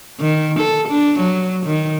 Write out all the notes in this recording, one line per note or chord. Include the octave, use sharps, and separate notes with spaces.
D#3
A4
D4
F#3
D#3